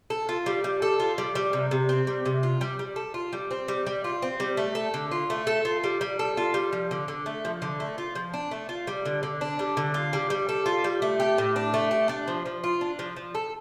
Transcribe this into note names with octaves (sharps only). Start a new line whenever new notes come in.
A4
F4
G3
G3
A4
F4
G3
G3
C3
C3
C4
G3
C3
F4
G3
G3
A4
F4
G3
C4
G3
G3
F4
C4
G3
A3
A4
D3
F4
A3
A4
F4
G3
G3
A4
F4
G3
F3
D3
D3
A3
F3
D3
A3
F4
F3
D4
A3
F4
G3
D3
D3
D4
G3
D3
F4
G3
G3
A4
F4
G3
A3
G4
A2
D4
A3
G4
D4
F3
F3
F4
D4
F3
F3
A4